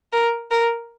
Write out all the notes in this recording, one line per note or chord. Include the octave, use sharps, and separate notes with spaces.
A#4
A#4